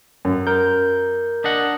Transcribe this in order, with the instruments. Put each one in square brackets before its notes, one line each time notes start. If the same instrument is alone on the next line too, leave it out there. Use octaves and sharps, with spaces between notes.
[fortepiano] F#2
[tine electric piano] A#4 G6
[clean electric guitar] D4 D#5 F#5